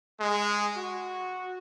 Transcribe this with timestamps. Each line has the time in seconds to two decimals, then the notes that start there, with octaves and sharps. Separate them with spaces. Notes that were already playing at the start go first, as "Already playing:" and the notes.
0.21 G#3
0.75 F#4